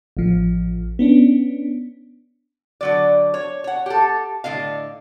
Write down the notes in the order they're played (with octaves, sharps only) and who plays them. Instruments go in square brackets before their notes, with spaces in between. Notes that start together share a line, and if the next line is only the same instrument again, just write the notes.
[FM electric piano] A1 F3
B3 C#4 D4
[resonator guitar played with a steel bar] D3 F#3 D5
C#5
C#5 F#5
G4 A4
A2 D3 D#5 F5